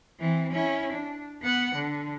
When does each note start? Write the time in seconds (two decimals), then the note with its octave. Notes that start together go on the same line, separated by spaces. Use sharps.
0.19 E3 C4
0.51 C#4 E4
0.91 D4
1.42 B3 F#5
1.74 D3